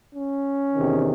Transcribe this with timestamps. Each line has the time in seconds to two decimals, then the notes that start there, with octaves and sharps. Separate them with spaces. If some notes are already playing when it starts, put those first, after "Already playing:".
0.15 C#4
0.74 E2 C3 D#3